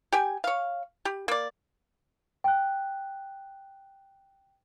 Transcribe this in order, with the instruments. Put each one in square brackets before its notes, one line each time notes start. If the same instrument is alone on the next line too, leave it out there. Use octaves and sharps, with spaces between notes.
[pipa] G4 G5 G#5
C#5 F5
G4
A#3 D5
[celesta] G5 F#6